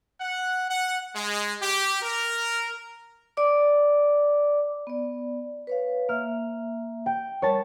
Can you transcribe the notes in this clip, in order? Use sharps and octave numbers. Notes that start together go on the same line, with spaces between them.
F#5
F#5
G#3
G4
A#4
D5 D6
B3 D5
B4 C#5 F5
A#3 E5 F6
G5
G3 A#4 C#5 A5